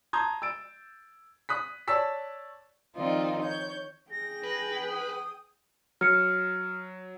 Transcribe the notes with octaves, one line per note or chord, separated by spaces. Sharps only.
A5 A#5 C6 D#6 G6 G#6
E6 A6 D7
D#6 F#6 B6
C#5 D5 A5 E6 B6
D#3 F3 C4 D#4 F4 D5
C#5 G6
G#4 G5 A#6
B4
D#6
F#3 F6 C#7